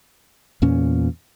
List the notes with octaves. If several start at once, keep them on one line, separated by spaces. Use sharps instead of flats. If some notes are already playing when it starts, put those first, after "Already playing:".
E2 A#2 C#4